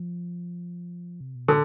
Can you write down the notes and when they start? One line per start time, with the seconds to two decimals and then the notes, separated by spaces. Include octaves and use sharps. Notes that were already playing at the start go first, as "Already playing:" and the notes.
Already playing: F3
1.21 C3
1.35 B2
1.48 A2 D3